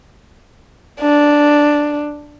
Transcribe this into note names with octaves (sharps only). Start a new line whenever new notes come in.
D4